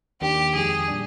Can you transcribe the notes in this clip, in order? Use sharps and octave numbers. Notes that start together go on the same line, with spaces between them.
D#2 D#3 A#3 D4 G4
F2 D#3 G#3 G#4
A#2 G3 D4